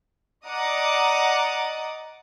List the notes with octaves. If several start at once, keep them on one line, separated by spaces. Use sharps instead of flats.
D5 D#5 F#5 A#5 D6 D#6